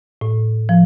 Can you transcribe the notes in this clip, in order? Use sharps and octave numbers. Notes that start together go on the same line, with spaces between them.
A2
F3